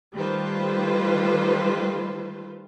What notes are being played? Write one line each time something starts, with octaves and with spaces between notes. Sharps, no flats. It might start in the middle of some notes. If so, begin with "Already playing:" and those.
D#3 G3 A3 F4 B4 C5